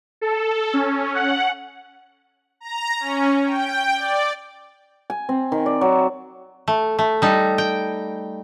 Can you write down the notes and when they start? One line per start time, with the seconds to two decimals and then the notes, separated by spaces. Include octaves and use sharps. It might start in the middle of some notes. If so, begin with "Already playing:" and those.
0.21 A4
0.74 C#4
1.15 F#5
2.60 A#5
3.00 C#4
3.46 G5
3.97 D5
5.10 G#5
5.29 C4
5.52 D#3
5.66 D5
5.81 F#3
6.68 A3
6.99 A3
7.22 G3 D#4 A4
7.58 G5